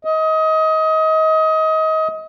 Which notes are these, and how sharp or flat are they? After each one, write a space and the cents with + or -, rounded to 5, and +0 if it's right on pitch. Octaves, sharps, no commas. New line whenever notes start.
D#5 +25